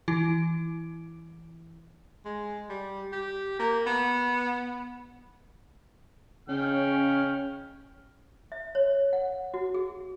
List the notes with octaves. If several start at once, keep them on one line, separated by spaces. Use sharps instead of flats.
E3 E4
G#3
G3
G4
A#3
B3
C#3 C#4 G5 F6
E5
C#5
F#5
F#4
G#4